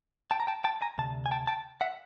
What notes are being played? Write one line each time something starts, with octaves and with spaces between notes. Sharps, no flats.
G5 A5
A#5
G5 A5
G5 A5
G#5 A#5
D2 C3 A5
G#5
G5 A5
G5 A5
E5 F#5